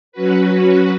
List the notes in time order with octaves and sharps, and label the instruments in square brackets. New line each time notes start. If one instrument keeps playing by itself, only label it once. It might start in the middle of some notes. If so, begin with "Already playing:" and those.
[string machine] F#3 C#4 F#4 B4